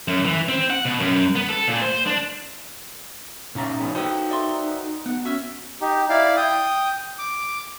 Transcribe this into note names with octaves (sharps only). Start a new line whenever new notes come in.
F#2
E3
C4
F#5
B2
F#2
B3
A4
A#2
C5
D4
B1 F#2 A#2 C#4 D#4 E5 A#5
C3 F3 B3
F#4 A4 B4 C5 G5 D#6 E6
D5 E5 C6
B3 F#5
C#4 F#4 E5
D#4 G4
E4 D5 F5
G5 D#6
D6